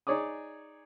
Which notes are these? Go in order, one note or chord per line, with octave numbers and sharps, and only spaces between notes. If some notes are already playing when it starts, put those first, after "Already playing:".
D#4 G#4 C#5 D5 D6 D#6